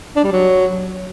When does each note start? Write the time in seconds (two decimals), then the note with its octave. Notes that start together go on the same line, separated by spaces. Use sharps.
0.16 D4
0.24 G3
0.32 F#3